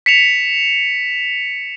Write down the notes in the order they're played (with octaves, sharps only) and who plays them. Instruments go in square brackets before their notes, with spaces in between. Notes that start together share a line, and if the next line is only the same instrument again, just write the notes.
[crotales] B6 C#7 E7 F7